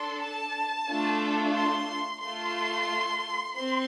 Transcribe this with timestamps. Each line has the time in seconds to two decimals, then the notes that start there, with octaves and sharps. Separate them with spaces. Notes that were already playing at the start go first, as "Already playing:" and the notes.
Already playing: D4 A4 C6
0.22 A5
0.89 A3 D4 F4 A4
1.56 C6
2.23 A3 F4 A4 C6
3.56 C4 C6